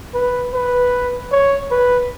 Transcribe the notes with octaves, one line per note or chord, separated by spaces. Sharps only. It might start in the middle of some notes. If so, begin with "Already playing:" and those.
B4
B4
C#5
B4